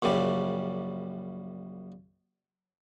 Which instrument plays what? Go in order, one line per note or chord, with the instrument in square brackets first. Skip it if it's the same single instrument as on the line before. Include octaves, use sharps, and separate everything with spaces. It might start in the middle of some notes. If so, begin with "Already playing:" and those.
[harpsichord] A#1 F#2 C#3 G3